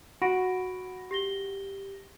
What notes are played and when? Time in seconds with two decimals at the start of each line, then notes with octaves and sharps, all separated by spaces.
0.22 F#4 B5 A#6 D7
1.11 G4 A#6 G7